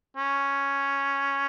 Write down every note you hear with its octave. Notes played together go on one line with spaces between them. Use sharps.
C#4